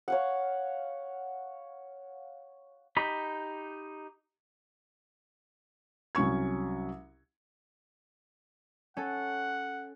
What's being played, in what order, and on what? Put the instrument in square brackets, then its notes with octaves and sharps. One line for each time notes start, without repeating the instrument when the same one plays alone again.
[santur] C#5 F5 F#5
[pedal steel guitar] D#4 G4 B5
[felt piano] C2 F#3 C#4 C#6 G#6
[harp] C#4 A4 [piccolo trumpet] F#5